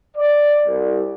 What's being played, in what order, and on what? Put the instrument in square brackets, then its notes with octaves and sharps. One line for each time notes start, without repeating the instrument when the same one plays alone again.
[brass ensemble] D5
C2